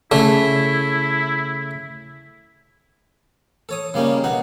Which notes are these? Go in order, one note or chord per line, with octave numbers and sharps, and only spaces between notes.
C#3 A3 E4
A4 C#5 D#6
C#3 G3 A#3 C#4 D#4
B2 D#4 F#5